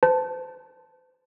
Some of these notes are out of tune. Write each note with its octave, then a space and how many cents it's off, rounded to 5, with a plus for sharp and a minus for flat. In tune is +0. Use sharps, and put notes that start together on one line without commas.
C5 -40 A5 +0